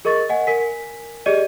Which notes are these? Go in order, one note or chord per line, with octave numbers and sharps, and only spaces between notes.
G#4 A#4 D#5 C#6 A6
D#5 F#5 G#5
A#4 G#5 B6
G4 G#4 D5 D#5 D#7